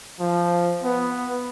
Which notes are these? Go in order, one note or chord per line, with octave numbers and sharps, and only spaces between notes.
F3
B3